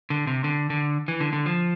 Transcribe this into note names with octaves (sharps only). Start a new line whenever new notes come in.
D3
C3
D3
D3
E3
D3
D3
F3